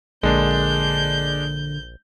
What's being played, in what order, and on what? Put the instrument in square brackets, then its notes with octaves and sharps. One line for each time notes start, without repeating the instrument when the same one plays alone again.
[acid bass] A#1 [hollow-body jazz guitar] D3 A#3 [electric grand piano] G#3 D4 [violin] G6